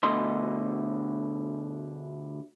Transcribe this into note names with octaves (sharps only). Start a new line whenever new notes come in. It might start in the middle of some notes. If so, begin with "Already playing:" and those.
D2 B2 D3 D#5 C6